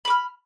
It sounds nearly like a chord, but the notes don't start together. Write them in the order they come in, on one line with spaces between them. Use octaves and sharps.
B5 D6 F6